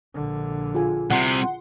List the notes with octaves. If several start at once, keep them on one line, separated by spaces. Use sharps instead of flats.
A#1 D3
F4 G#4 G#5
C2 C3 F#5 C6